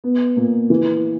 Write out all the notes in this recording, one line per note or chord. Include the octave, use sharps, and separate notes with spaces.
B3
A#2
E3